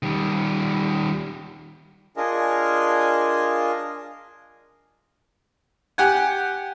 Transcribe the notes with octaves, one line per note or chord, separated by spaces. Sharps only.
D#3 G3
D4 F4 G#4 A#4 D#5 G#5
G4 F#5 G#5